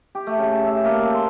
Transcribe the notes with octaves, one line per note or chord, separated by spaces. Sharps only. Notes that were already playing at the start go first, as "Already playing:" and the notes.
G4
A3
C#3
A5
E5
A#3
A5
C6